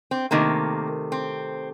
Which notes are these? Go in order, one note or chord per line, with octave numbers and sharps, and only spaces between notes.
C4
C3 D#3 A3 A#3
C4